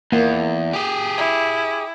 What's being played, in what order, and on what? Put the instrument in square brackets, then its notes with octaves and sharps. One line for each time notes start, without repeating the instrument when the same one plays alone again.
[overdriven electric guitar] E2 [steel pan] A#3
[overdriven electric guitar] G4 G#4
[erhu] E4